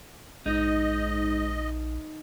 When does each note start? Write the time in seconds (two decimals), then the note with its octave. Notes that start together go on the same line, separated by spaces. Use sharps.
0.46 A#1 G#2 D#4 D#5